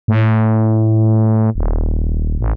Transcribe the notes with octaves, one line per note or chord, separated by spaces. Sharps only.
A2
D#1
A1